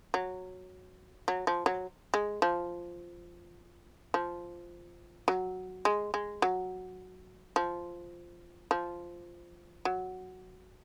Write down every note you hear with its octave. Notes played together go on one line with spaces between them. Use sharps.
F#3
F#3
F3
F#3
G#3
F3
F3
F#3
G#3
G#3
F#3
F3
F3
F#3